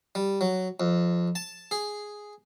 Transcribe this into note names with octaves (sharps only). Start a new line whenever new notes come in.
G3
F#3
F2
A5
G#4